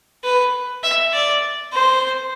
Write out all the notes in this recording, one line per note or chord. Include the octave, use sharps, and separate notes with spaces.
B4
E5
D5
C5